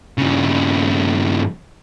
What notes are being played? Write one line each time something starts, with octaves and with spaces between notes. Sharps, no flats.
G2 C#3